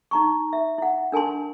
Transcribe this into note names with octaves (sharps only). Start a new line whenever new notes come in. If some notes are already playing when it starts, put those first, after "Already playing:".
D#4 A#5 C#6
E5
E4 F#5
D4 A#4 G#5 A5 C6